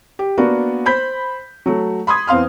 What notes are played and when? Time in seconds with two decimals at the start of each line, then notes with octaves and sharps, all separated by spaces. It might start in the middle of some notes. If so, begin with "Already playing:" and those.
0.19 G4
0.38 A#3 B3 D4 F#4
0.86 C5 B5 G6 B6
1.66 F#3 A3
2.07 B5 C6 D#6 G#6
2.27 E2 C4 F5 C6 F6